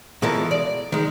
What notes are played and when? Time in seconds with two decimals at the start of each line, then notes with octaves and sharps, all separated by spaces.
0.22 B2 E3 F3 G#3 A4 A#4
0.51 D5
0.92 D#3 G#3